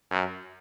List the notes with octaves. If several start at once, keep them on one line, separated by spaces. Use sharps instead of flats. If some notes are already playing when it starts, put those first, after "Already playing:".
F#2